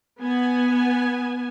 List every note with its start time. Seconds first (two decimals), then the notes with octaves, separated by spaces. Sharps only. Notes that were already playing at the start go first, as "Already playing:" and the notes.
0.21 B3 G#5